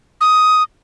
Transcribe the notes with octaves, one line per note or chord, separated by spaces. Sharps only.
D#6